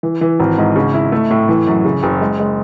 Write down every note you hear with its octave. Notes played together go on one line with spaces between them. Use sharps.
E3
E3
G#1
G#2
C#3
E4
A3
A2
E3
F#2
C#3
F#1
G#3
G#3